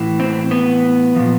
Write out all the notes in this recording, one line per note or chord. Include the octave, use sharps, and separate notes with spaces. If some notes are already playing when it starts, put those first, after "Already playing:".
Already playing: A2 E3
C4
B3
A#2 F3